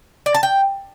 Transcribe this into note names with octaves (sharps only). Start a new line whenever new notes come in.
D5
A5
G5